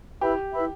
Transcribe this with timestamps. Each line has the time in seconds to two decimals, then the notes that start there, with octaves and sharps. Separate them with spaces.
0.21 E4 G4 B4 E5 B5
0.53 E4 B4 E5 B5